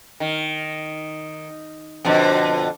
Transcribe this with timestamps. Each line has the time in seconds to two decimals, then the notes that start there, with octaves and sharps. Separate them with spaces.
0.20 D#3
2.05 F2 B2 D3